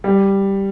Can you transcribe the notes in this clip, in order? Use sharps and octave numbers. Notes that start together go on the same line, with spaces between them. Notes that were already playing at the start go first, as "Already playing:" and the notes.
G3